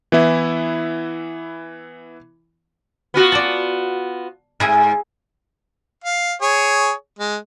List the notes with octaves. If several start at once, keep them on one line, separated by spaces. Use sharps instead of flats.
E3 B3 E4
B3 F4 F#4
D5 A5
G#2 E4 G#4 G#5
F5
G#4 C#5
G#3